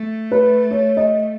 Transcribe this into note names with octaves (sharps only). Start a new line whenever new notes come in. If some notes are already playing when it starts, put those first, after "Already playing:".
Already playing: A3
B4
C#5
D#5